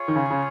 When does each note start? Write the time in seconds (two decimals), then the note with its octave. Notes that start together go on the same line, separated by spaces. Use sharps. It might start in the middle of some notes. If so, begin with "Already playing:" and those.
Already playing: F4 G#4 C#5
0.08 D#3
0.16 C#3
0.31 C#3